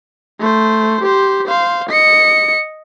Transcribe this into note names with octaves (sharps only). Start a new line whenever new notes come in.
A3 C5
G4 C5
C5 F5
D#5 C#7